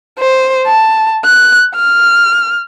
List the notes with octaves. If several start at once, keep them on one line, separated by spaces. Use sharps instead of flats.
C5
A5
F#6
F6